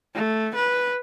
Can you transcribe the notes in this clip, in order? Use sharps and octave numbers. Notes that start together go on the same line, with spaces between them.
A3
B4